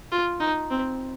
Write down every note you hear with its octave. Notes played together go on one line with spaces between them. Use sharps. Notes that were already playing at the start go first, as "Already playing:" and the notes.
F4
D#4
C4